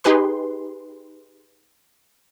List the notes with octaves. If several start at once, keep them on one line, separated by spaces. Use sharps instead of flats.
D#4 G4 G#4 B4 C6